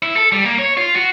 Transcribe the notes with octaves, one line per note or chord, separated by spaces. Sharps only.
E4
A4
G3
A#3
C#5
F4
F#4